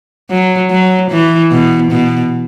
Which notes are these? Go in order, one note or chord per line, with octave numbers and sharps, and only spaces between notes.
F#3
F#3
E3
B2
B2